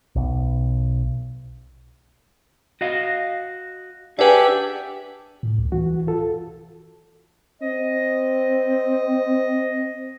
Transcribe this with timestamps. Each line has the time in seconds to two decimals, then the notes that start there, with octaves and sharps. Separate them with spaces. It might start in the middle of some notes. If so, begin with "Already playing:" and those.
0.16 B1
2.81 F#4 D#5 F5
4.19 D4 G4 G#4 B4 D5 E5 F#5 G#5
5.43 A2
5.58 C#2
5.72 E3 F#4
6.07 F4 A4
7.62 C4 D#5